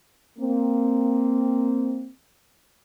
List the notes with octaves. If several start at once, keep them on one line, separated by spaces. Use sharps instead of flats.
A#3 C4